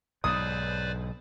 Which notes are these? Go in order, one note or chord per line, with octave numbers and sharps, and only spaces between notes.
B1 G#2 B4 C5 D5 D#6